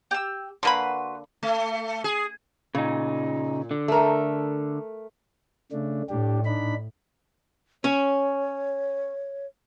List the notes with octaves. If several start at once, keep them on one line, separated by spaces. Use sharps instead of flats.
G4 E6
D3 A#3 F#4 B4 B5 C6
A3
G#4
A#2 C#3 D#4
D3
A3 A#4
C#3 A3 D4
A2 D4 G4
D4 D#4 B5
C#4 C#5